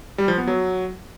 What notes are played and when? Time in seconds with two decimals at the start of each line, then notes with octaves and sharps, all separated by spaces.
0.18 G3
0.28 F3
0.38 B3
0.47 F#3